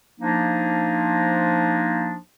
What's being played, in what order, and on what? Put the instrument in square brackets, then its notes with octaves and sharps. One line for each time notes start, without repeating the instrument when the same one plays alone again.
[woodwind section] F3 A#3 D4 D#4